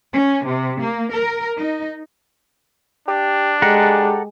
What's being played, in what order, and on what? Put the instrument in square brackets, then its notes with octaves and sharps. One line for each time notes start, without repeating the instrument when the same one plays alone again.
[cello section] C#4
C3
A#3
A#4
D#4
[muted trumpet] D4 [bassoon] G4
[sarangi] G#3 [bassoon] G4 [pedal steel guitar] A4 F#5 A#5